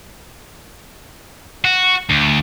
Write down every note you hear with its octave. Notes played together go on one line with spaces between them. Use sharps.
F#4
D2